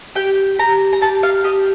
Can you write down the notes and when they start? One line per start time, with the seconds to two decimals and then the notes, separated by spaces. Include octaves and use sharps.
0.15 G4 G5
0.58 G4 A#5
0.93 A#5
1.01 G4 A5
1.23 F5
1.44 G4 D#5